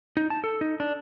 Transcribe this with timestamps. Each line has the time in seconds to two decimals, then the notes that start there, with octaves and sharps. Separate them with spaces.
0.17 D#4
0.30 A5
0.44 A4
0.61 D#4
0.80 D4